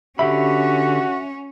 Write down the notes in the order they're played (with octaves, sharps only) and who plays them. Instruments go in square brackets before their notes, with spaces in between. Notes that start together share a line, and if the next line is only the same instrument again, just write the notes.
[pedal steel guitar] D3 G4 B5 [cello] C#4 [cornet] F#4 [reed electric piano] E5